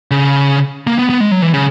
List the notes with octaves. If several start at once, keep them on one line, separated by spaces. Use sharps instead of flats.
C#3
A#3
B3
B3
G#3
F#3
E3
C#3